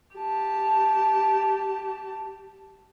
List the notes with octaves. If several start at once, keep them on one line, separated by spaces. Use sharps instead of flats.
G4 A5